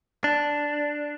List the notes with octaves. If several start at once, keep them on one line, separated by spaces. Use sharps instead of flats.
D4